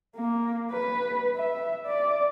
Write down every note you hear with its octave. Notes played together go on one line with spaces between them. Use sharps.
A#3
B4
E5
D5